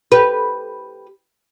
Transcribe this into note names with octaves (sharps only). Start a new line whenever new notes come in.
G4 B4